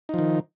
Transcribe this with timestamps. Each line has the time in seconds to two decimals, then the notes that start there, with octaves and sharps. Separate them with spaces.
0.09 D#4
0.14 F3
0.19 D#3